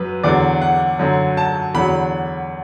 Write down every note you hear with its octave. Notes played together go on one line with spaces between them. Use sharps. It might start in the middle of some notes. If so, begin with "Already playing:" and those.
Already playing: F#2 F#3 B4
E2 D3 F#3 D5
F#5
F#2 D3 F#3
A5
E2 D3 F#3 B5